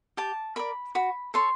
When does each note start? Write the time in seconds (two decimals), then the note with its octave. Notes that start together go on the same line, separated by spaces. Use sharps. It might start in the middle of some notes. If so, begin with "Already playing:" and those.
0.17 G4 A5
0.56 A#4 D5 B5
0.95 F#4 B5
1.34 A4 C#5 C6